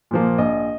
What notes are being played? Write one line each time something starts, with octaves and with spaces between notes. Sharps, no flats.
A#2 F3 A#3
A#1 D#5